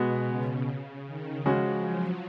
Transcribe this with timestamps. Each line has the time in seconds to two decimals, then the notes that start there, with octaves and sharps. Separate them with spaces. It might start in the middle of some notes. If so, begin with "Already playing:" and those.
Already playing: B2 G#3 B3 F#4
0.26 C#3
0.66 C#3
1.06 D#3
1.46 C#3 F3 G#3 C#4 F#4
1.86 F#3